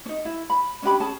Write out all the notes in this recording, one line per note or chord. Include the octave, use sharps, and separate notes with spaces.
C#4 D#4
E4
B5
C#4 D4 G4 B5
C#4 G#4 A5